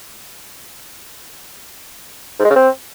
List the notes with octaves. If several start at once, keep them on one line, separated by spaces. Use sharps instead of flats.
G#2
G#3
C#3
C4